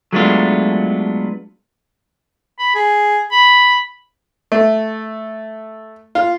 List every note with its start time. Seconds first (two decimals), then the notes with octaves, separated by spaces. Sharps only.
0.13 F#3 G#3 A3 B3 D4 F4
2.59 B5
2.75 G#4
3.32 B5
4.52 A3
6.15 F4